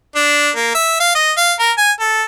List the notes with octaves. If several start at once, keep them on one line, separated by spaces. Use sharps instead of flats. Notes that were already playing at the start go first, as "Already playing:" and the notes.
D4
A#3
E5
F5
D#5
F5
A#4
G#5
A4